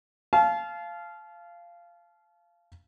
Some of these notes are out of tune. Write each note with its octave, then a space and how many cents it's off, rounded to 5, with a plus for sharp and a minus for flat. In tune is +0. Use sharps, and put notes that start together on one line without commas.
F5 -15 A5 -35